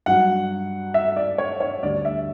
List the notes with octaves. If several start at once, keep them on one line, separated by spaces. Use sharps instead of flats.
G2 F#3 F#5
E5
D5
C#5
C#5
D2 D3 G3 D5
E5